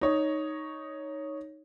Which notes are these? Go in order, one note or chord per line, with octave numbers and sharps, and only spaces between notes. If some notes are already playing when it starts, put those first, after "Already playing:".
D#4 C#5